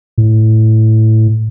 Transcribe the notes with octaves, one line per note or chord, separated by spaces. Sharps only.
A2